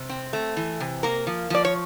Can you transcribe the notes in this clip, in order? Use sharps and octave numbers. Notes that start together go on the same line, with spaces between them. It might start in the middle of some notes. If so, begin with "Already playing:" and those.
Already playing: C3
C4
A3
E3
C3
A#3 A#4
F3
F3 D5
C#5